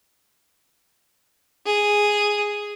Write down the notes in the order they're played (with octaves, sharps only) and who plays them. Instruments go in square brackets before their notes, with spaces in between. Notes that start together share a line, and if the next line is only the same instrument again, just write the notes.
[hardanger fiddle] G#4